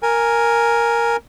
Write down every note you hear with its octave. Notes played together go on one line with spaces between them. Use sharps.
A#4 G#5